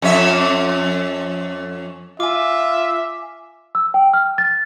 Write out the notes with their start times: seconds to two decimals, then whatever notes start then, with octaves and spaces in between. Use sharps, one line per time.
0.02 F2 C#4 E5
2.20 F4 E5 G#5 D6
3.75 E6
3.94 G5
4.13 F6
4.38 A6